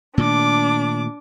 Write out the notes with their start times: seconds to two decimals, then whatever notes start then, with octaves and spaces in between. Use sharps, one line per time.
0.18 A#2 D#3 A3 D4 D6